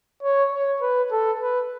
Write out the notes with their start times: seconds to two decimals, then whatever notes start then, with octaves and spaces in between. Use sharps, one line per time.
0.23 C#5
0.52 C#5
0.81 B4
1.11 A4
1.40 B4